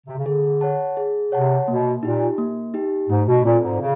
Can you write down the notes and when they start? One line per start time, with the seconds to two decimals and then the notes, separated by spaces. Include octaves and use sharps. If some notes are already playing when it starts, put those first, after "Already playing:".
0.07 C3
0.16 C#3
0.26 D3 G#4
0.61 C#5 F#5 A5
0.97 G#4
1.32 C3 C#5 F#5 A5
1.68 B2 A#3
2.03 A#2 D#4 G4
2.38 A#3
2.74 D#4 G4
3.09 G#2 A3
3.27 B2
3.44 A#2 C4 F4 A4 D5
3.63 G#2
3.80 C#3